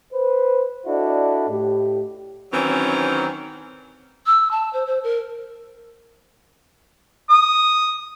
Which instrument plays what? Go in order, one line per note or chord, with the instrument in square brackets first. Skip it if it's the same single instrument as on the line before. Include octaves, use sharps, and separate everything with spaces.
[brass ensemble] B4 C5
D4 E4 F#4 A4 D5 D#5
A2 G4
[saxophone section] D#3 E3 F#3 C4 C#4
[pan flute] E6
A5
C5
C5
A#4
[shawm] D#6